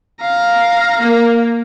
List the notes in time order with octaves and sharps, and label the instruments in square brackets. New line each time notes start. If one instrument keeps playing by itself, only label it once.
[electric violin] F5 A#5
[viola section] A#3